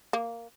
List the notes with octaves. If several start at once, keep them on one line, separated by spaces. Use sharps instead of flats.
A#3